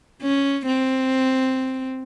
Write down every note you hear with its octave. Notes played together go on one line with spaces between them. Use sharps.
C#4
C4